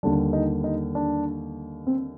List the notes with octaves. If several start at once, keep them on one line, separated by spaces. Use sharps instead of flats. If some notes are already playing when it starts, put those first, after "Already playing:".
D#2 D3 G3 D4
D#4
D#4
D4
C4